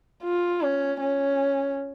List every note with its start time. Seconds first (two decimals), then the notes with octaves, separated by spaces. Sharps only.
0.23 F4
0.62 C#4
1.00 C#4